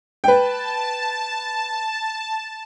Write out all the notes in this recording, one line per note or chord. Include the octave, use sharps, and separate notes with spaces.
B4 G5 A5